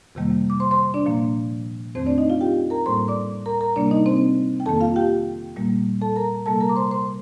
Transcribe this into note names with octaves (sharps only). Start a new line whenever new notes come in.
F2 C3 D#3 G3 A#3
D6
C5 C6
C5 C6
D4 D5
A#2 F3 A#3
F2 D#3 A3 C4 C5
D4 D5
D#4 D#5
F4 F5
G4 G5
A#4 A#5
A2 G3 A#3 C5 C6
D5 D6
A#4 A#5
A#4 A#5
C3 G3 A#3 D4 D5
D#4 D#5
C4 C5
G5
F2 D#3 A#3 A4 A5
F4 F5
G4 G5
A#2 G3 A#3
A4 A5
A#4 A#5
C3 G3 A#3 A4 A5
A#4 A#5
D6
C5 C6
C5 C6